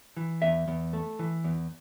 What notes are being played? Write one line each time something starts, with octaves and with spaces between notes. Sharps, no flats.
E3
E2 E5
E2
A3
E3
E2